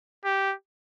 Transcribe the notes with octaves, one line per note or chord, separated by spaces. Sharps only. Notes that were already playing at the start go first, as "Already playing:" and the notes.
G4